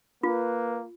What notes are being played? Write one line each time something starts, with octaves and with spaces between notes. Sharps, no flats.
A#3 F4 B4